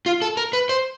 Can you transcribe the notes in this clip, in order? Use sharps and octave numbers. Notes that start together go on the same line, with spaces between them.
F4
A4
A#4
B4
C5